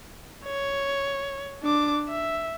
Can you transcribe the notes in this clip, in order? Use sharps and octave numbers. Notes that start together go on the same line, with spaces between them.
C#5
D4 D6
E5